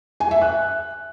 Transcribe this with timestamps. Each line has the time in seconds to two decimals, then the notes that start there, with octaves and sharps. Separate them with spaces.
0.20 G#5
0.31 E5
0.42 F#6